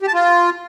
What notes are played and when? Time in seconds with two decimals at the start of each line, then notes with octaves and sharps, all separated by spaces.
0.02 G4
0.08 A5
0.14 F4